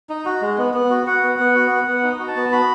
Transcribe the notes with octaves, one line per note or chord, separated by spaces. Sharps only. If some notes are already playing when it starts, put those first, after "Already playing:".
D#4
F#4
G#3
B3
B3
F#4
F#4 F#5
B3
B3
F#4
B3
B3
D#4
F#4
A5
B3
F#4 B5